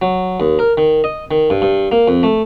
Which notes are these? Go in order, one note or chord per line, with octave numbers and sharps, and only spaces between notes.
F#3
D#2
A#4
D#3
D#5
D#3
G2
G2
A#3
F2
A3